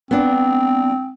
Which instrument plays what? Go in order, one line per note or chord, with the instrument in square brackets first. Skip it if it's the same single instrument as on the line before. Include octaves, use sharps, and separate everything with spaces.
[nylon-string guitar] B3 D4 [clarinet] C4